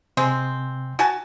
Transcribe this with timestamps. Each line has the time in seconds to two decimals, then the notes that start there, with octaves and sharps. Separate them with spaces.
0.17 C3 G#3 C4
0.99 F#4 G#5 A5